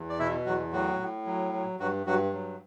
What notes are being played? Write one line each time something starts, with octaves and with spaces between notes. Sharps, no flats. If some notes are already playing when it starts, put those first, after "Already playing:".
Already playing: E2
D5
B2 E4 E5
E2 F#3 F#4
A2 F#3 F#4
A2
F#3
F#3
G2 F#3 F#4
G2 F#3 F#4
F#3